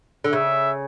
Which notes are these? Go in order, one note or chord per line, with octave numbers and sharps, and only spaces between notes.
D3
C#3 E5